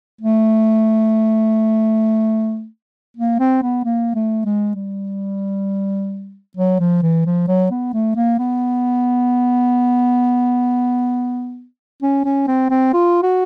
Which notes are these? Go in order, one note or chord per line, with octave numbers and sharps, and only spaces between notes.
A3
A#3
C4
B3
A#3
A3
G#3
G3
F#3
F3
E3
F3
F#3
B3
A3
A#3
B3
C#4
C#4
C4
C4
F4
F#4